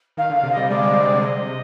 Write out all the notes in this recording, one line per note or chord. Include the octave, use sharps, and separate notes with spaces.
D#3 F5
D3
F5
C3
G3 D#5
G#3 D5
C4
D3
C3
D#5